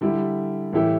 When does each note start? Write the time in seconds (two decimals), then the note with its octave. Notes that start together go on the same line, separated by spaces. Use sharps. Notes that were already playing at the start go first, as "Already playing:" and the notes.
0.01 D3 G3 E4
0.73 A2 E3 A3 E4 G4